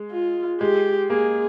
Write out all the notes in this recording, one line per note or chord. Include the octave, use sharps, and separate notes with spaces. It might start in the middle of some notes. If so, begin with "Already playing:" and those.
Already playing: G#3
F4
G#3 G4
A#3 G#4